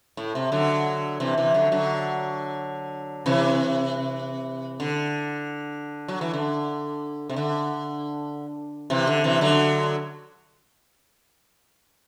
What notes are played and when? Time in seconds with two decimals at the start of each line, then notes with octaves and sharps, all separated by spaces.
0.17 A2
0.35 C3
0.52 D3 F#3
1.20 C3 E3
1.37 C3 E3
1.54 D3 F#3
1.72 D3 F#3
3.26 C3 E3
4.80 D3
6.08 F#3
6.21 E3
6.34 D3
7.29 C3
7.36 D3
8.90 C3 E3
9.07 D3
9.24 C3 E3
9.41 D3 F#3